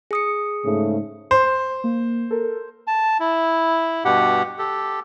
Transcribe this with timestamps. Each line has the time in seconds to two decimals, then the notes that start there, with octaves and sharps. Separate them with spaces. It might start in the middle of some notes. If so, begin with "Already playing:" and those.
0.11 G#4 D#6 C#7
0.65 G#2 C#3 A3
1.31 C5
1.84 A#3
2.30 A4 A#4
2.87 A5
3.20 E4
4.05 G2 B2 G4 F#5
4.59 G4 A4